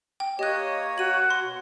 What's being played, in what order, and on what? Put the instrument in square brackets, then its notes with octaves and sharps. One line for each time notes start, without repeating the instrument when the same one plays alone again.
[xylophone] G5
[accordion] A#3 C#5 [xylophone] G4 F#6 [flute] D#5
[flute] F#4 [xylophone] D#7 F#7
[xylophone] C6
[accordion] B2